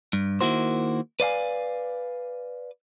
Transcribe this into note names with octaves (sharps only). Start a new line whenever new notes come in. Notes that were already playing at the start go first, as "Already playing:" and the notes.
G2
D#3 A#3 E4 F#4 C5
B4 D5 F5 G#5